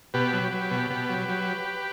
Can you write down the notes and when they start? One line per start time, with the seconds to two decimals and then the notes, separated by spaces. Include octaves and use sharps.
0.14 B2 G4 B4
0.33 F#3
0.52 F#3
0.71 B2
0.90 B2
1.09 F#3
1.28 F#3